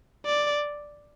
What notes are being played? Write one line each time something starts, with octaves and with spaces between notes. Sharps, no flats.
D5